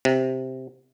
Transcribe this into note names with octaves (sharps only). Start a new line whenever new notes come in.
C3